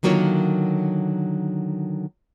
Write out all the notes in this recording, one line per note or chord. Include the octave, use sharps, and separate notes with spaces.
D3 D#3 F#3 A#3 F4 C#5